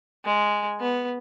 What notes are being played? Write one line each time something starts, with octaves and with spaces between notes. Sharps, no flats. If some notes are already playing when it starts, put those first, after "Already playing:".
G#3
B3